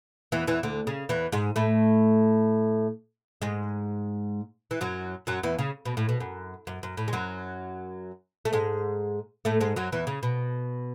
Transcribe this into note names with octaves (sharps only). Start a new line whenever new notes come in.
E2 E3
E2 E3
D2 D3
C#3
E2 E3
G#2 G#3
A2 A3
G#2 G#3
E3
F#2 F#3
F#2 F#3
E2 E3
C#3
B2
A2
B2
F#2
F#2
F#2
A2
G#3
F#2 F#3
A3
G#2 G#3
A2 A3
G#2 G#3
F#2 F#3
E2 E3
C#3
B2